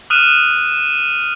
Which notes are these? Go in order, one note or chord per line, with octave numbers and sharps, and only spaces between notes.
D#6 F6 F#6 D#7 E7